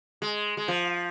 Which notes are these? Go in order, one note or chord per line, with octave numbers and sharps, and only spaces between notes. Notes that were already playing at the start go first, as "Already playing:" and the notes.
G#3
G#3
F3